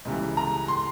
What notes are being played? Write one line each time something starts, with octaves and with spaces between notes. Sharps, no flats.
C#2 C#3 E3 G3
A#5
C6